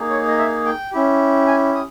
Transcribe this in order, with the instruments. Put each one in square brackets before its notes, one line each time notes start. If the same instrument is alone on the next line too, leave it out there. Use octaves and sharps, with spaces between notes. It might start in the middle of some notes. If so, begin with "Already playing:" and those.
Already playing: [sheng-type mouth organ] A#3 D#4 G#4
C#5
D#5
E5
G5
C#4 E4 G4
G#5
D#6